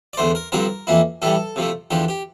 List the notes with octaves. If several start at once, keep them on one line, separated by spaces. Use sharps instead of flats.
D5
E2 D3 A3 C5
A#4
G2 D3 F3 C4 A#4
F2 E3 A#3 E4
A2 E3 G3 A4
C3 F3 A3
E2 D3 F3 G4
G4